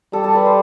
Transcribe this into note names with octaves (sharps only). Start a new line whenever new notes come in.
G3 A4
A4
B4
C5